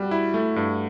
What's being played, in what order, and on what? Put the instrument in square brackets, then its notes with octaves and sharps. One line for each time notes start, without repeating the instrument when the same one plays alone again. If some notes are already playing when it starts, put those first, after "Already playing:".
Already playing: [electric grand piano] G3 [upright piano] F#4
[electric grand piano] E4
A3
G2